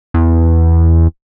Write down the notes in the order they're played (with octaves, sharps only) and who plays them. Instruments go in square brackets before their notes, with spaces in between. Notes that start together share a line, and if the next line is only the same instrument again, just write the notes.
[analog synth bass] E2